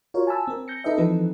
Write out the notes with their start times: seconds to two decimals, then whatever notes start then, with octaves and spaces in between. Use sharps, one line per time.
0.14 F4 F#4 A#4 C#5
0.27 G#5 A5 B5 E6
0.48 C4 A#4
0.68 G6 A#6 C#7
0.84 D#4 A4 B4 D#5 E5
0.97 E3 F3 C4 D#4 A4 B4